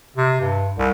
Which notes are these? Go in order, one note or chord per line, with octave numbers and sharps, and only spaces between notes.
C3
G2
C2